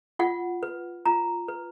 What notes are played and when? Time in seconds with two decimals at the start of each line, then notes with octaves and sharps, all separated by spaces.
0.19 F4 F#5
0.63 B4
1.06 F4 A#5
1.48 B4